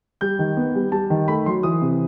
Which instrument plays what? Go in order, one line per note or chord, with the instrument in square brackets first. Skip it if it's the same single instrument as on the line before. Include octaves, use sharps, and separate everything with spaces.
[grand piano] G3 G6
D#3
B3
G3
G3 A5
D#3
A3 B5
F#3 C6
E3 D#6
C3